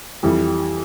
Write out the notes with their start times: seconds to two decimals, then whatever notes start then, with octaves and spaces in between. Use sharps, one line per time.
0.23 F2 E3 G3